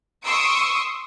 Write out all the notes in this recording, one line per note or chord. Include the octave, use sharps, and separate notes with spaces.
C6 C#6 D#6 E6 D7